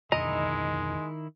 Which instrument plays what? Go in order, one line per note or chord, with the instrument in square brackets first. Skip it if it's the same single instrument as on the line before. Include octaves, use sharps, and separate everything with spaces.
[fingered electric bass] F2 B2 D3 [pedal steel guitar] D#3 E4 A#5 [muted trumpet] G#3 [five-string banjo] D#5